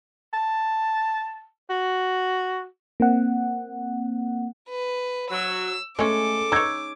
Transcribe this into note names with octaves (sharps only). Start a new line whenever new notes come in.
A5
F#4
A#3 C4 F#5
B4
F#3 E6
G#3 A3 C#4 A4 D6
D#4 C#5 E6 G#6